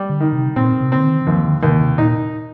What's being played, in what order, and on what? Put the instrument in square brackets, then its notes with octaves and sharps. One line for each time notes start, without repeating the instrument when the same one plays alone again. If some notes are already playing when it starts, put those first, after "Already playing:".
Already playing: [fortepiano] G3
[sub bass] D3
[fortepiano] D#3
[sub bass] C3
[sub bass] A#2 [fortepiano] C4
[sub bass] C3
[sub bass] D3 [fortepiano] C4
[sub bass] D#3
D#3
[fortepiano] D#2 [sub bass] F3
[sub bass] D3
[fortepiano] D#2 [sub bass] C3
[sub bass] C3
[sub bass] A#2 [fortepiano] D#4